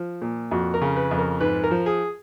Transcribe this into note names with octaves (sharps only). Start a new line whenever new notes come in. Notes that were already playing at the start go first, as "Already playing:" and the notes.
Already playing: F3
A#2
F2 F#4
A#4
C#3
B4
F2
A#4
G#2 B4
A#4
F3
G#4